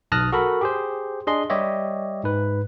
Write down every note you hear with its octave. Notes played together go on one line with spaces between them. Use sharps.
B1 A5 D#6 F6 F#6 A#6
F#4 A4 A#4 B5
G4 G#4 C5
D4 G#4 D#5 C6
G3 G4 C#5 D#5 E5
G#2 B4